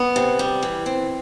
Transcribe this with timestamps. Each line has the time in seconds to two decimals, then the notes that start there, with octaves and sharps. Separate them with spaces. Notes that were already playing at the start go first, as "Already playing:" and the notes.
Already playing: B3
0.16 C3
0.39 G3
0.63 E3
0.86 C4